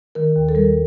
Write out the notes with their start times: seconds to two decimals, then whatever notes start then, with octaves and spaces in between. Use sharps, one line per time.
0.15 D#3 A#4
0.36 D#2
0.49 A4
0.55 G3 A#4